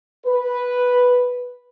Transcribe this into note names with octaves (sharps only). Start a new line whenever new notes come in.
B4